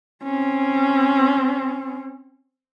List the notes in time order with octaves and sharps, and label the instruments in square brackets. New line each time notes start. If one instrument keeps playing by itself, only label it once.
[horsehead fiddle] C4 C#4